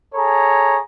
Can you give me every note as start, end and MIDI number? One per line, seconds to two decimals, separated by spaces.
0.15 0.79 68
0.15 0.79 69
0.15 0.79 73
0.15 0.79 82